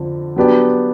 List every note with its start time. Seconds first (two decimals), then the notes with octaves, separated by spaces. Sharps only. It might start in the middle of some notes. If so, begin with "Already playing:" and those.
Already playing: F2 D3 F3
0.36 F#3 B3 D4 G4